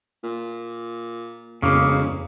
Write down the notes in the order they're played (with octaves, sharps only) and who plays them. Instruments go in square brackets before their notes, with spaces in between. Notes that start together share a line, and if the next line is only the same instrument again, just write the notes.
[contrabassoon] A#2
[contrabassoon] E1 [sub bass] F2 [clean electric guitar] C#3 A#3